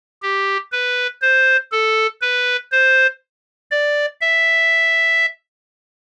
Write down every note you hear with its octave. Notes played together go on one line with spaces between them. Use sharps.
G4
B4
C5
A4
B4
C5
D5
E5